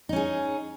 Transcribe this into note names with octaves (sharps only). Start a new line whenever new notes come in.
C#4 D#4 G#4